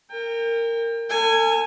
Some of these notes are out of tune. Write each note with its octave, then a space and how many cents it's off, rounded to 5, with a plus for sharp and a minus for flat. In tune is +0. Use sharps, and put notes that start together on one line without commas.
A#4 -15 G5 +35
A4 +40 G#5 -5